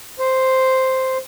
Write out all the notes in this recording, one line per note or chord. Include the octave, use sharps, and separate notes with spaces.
C5